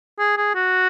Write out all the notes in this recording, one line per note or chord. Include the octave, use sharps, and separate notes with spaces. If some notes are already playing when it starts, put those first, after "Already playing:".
G#4
G#4
F#4